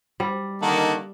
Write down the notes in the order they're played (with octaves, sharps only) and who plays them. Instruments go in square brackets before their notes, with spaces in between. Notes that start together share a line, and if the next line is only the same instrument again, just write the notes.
[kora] G3
[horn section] D3 D#3 [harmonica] A#3 A4 F#5